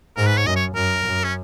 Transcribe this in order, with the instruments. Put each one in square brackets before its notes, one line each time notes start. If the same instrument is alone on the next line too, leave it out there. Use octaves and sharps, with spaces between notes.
[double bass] G#2 [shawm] A#4
[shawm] B4
C#5
[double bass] F#2 [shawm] D#5
[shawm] C#5
[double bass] F#2 [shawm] A#4
[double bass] F#2
[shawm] C#4